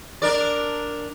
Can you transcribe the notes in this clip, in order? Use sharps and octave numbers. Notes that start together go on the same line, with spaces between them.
D4 A#4 D5